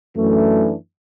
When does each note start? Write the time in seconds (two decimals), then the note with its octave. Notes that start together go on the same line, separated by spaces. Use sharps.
0.13 F#2 E3 A3 D4